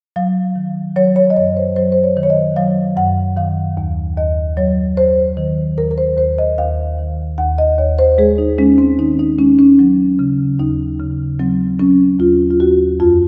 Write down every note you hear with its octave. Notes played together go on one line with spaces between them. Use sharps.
F#3 F5
D#3
F#3 C#5
C#5
D#5
F#2 C#5
C5
F#3 C5
C5
C#5
D#3
C#5
D#5
F#3 F5
F#2 F#5
D#3 F5
D#2
D#2 D#5
F#3 C#5
D#2 C5
D#3
D#2 A#4
A#4
C5
D#2 C5
D#5
D#2 F5
D#3
D#2 F#5
D#5
D#2 C#5
C5
G#3 G#4
D#4
G#3 C#4
C4
D#3 D#4
D#4
G#3 C#4
C#4
F#3
C#3
D#2 D#4
C#3
F#3 C4
F#3 C#4
D#2 F4
F4
D#2 F#4
F2 F4